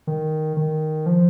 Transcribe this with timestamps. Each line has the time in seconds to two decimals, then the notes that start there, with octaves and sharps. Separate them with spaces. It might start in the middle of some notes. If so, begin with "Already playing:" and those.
0.07 D#3
0.57 D#3
1.06 F3